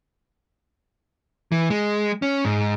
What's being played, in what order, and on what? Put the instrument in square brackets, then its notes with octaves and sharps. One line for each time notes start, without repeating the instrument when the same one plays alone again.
[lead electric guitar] E3
G#3
C#4
G#2